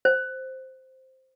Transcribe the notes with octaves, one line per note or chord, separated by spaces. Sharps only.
C5